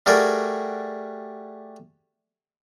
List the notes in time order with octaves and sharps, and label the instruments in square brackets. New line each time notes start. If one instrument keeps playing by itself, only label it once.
[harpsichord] G3 A3 F#4 G#4 A#4 D5